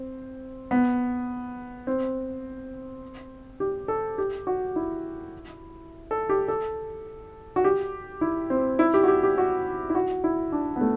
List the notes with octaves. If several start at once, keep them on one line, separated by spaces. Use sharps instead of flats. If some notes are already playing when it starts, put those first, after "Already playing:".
Already playing: C4
B3
C4
G4
A4
G4
F#4
E4
A4
G4
A4
F#4
G4
E4
C4
E4
G4
F#4
G4
G4
F#4
E4
F#4
E4
D4
B3
A3